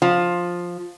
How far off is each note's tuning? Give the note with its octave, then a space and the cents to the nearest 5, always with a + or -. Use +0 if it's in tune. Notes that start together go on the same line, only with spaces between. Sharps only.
F3 +10 F4 +10